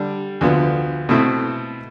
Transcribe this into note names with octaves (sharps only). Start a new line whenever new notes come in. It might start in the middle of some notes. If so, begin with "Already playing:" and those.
Already playing: D3 G3 D4
D2 D3 F3 B3
B2 A3 C4 E4